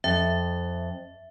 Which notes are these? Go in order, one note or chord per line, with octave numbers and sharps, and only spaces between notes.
F2 E5